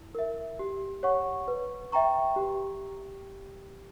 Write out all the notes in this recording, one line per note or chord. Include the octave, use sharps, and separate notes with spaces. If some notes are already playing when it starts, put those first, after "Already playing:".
Already playing: E4
A#4 E5
G4
C#5 F#5 C#6
B4
E5 G5 A#5 C#6
G4